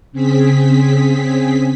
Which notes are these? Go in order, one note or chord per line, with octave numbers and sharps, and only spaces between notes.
C#3 C4 G#4 B6